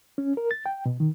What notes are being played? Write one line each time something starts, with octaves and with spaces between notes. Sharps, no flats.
C#4
A#4
A6
G5
B2
D#3